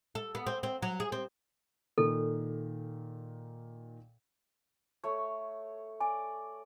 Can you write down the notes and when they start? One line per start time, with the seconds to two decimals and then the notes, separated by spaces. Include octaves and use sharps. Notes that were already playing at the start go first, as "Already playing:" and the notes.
0.15 A4
0.35 B3
0.47 C4
0.63 C4
0.82 F#3
1.00 G#4
1.12 C4
1.98 A#2 D#3 A4
5.04 A3 C#5
6.00 D5 G#5